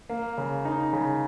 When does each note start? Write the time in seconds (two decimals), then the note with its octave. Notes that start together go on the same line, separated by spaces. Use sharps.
0.10 A#3
0.38 C#3
0.65 D#4
0.93 C#3